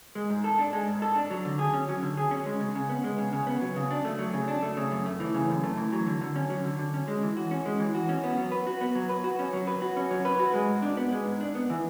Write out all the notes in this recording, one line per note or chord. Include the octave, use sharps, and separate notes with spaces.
G#3
G#2
A4
D4
G#3
G#2
A4
D4
F#3
D3
G#4
C#4
F#3
D3
G#4
C#4
G#3
C#3
C#3
B3
G#3
C#3
C#3
B3
F#3
C#3
D4
A3
F#3
C#3
D4
A3
C#3
F#2
A3
E3
C#3
F#2
A3
E3
F#3
D3
D3
C#4
F#3
D3
D3
C#4
G#3
E3
F#4
C#4
G#3
E3
F#4
C#4
B3
F#3
B4
F#4
B3
F#3
B4
F#4
C#4
F#3
B4
F#4
C#4
F#3
B4
F#4
G#3
G#2
D4
B3
G#3
G#2
D4
B3
E3